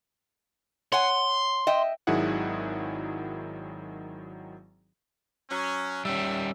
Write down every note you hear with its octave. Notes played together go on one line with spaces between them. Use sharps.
C#5 F#5 G#5 C6
D#5 E5 G5
G#1 D#3 F#3 E4 G#4 F#5
F#3 C#4
D#3 G3 C#4 E5